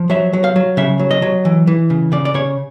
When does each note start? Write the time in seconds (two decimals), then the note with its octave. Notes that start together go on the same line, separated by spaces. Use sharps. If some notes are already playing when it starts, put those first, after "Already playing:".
Already playing: F3
0.10 F#3 E5
0.33 F#3
0.44 F5
0.56 F#3
0.77 C#3 E5
1.00 F#3
1.11 D#5
1.22 F#3
1.45 E3
1.67 E3
1.90 C#3
2.12 C#3 D5
2.25 D5
2.34 C#3 C#5